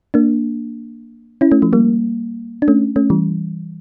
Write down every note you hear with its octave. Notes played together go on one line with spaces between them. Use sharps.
A#3 D4
C#4 E4
A3 C#4
F3 A3
G3 A#3
D4
A3 C#4
A3 C#4
E3 G3